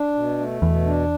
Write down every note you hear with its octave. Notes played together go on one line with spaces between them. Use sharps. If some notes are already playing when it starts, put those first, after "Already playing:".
Already playing: D4
B2
A3
E2 B2
D4